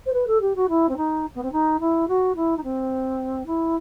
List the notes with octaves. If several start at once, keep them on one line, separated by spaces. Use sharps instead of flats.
C5
B4
A4
G4
F#4
E4
C4
D#4
B3
C4
D#4
E4
F#4
E4
D#4
C4
E4